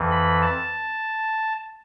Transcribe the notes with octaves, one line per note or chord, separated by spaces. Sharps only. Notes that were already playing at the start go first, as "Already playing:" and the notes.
Already playing: F2 E3
B5
A5